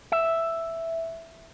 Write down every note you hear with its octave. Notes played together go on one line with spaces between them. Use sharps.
E5